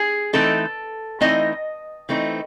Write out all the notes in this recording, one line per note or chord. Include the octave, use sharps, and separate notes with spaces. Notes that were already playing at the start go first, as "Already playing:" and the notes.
Already playing: G#4
E3 A3 C4 D#4 A4
E3 A3 C4 D#4 D#5
E3 A3 C4 D#4